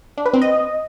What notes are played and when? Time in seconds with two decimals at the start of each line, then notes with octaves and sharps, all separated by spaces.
0.18 D4
0.26 B4
0.34 C4
0.42 D#5